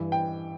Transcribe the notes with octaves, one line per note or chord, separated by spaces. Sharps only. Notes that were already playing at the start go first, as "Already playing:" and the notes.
Already playing: G2 E3
G5